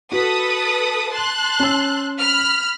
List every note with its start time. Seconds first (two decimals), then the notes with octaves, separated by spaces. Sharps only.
0.12 F#4 A4 B4 D#6
1.11 A5 C6 F#6
1.59 C#4 E6
2.19 B5 F6